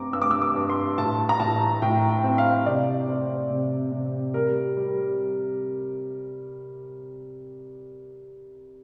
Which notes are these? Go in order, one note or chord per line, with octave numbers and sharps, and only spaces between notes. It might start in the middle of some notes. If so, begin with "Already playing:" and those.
Already playing: G2 C4 A#5 D6
G2 E6
D6
E6
D6
G2
C6
A2 A5
A#5
A2 A5
A2 G5
G5
C4
F5
C3 D5
C4
C3
C3
G3 A#4
G3